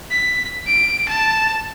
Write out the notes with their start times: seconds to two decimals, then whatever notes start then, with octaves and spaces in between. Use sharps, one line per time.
0.11 B6
0.67 D7
1.09 A5